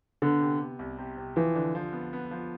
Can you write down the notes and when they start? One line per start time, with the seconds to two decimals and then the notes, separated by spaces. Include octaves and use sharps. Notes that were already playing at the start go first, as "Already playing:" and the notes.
0.22 D3 B3
0.41 C3
0.60 C3
0.79 C2
0.98 C3
1.17 C3
1.36 E3 F3
1.55 D3
1.75 F3
1.93 B3
2.13 B3
2.31 F3